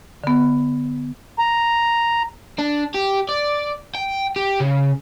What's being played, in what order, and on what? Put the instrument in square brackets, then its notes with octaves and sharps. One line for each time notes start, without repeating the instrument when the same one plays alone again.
[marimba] D3 B3
[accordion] A#5
[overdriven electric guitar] D4
G4
D5
G5
G4
C#3